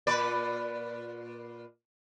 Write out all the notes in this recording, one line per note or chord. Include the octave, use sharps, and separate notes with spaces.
A#2 B4 D5